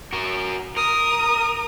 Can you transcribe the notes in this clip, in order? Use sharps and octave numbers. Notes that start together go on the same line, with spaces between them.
F#4 A#4
A#4 D#6